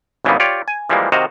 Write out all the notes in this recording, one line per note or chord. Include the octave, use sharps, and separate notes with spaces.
G#1 C#3 E3 G3 A#3 B3
F4 G4 C#5 D5
G#5
E3 F3 G3 G#3 A#3
C3 D#3 F#4 C5 D#5 F5